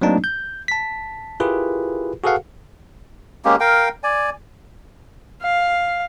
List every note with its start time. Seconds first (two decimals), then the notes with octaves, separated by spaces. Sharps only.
0.01 F#3 A3 A#3 C4 D4 D#4
0.24 G6
0.68 A5 B6
1.40 E4 F4 G4 G#4 A#4 B4
2.24 F#4 G#4 A4 B4 F5 F#5
3.45 G#3 A#3 C#4 G4
3.60 A#4 F5 G5
4.03 D5 G#5
5.42 F5